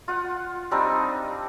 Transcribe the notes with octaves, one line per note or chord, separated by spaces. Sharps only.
F4 F#5
G3 C4 D4 D#4